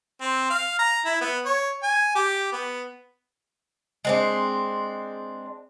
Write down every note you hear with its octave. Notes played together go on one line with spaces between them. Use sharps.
C4
F5
A#5
E4
B3
C#5
G#5
G4
B3
G#3 C4 D4